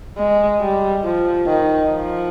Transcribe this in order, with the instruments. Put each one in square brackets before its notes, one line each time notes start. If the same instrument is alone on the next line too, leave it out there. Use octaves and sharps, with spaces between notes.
[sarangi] G#3
G3
F3
D#3
F3